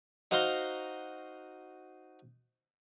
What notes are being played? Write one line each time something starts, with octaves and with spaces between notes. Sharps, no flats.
D#4 F#4 C5 F5 A#5 C6